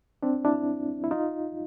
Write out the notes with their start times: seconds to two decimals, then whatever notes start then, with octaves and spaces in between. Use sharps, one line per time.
0.23 C4 D4
0.45 D4 E4
1.04 E4
1.11 D#4 F4